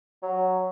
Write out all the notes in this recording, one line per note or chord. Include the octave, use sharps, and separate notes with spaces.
F#3